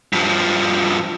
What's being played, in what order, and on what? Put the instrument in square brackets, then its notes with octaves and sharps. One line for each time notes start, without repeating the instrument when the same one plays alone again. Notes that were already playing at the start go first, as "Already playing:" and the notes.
[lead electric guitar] G2 F3